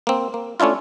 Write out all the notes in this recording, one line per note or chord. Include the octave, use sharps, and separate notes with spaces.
A#3 C4
A#3
A3 C#4 D4 E4 F4